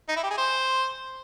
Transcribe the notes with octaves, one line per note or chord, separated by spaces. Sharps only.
D#4
E4
G4
G#4
C5